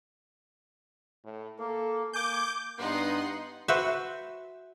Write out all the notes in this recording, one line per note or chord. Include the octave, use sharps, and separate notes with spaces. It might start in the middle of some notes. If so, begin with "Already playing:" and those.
A2
A#3 A4
A#3 G#5 D6 G6
G2 B3 D#4 F#5 C6
F#4 B4 C5 E5